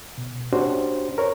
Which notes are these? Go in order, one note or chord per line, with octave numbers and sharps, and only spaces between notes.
B2
C#4 D4 F#4 G4 C5
A#4 C#5